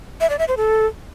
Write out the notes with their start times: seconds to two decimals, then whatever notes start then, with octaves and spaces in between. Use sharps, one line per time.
0.21 E5
0.30 D5
0.39 E5
0.48 C5
0.57 A4